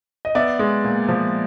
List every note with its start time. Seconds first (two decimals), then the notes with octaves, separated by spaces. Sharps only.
0.25 D#5
0.35 B3 D5 E5
0.59 G#3
0.84 A#2
1.09 F3